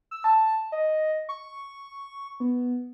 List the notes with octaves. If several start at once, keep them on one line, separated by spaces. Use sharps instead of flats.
E6
A5
D#5
C#6
B3